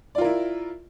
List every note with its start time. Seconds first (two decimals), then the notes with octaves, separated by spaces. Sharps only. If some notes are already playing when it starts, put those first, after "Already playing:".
0.15 D5
0.18 F4
0.21 A#4
0.24 E4